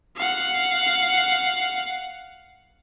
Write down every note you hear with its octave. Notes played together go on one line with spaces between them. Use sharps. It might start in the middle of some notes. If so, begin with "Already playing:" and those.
F5 F#5